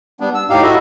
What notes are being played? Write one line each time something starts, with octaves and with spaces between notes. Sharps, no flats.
G3 B3 D4
E6
A2 D#4 G4 F5
E4 F#4 A4 D#5 E5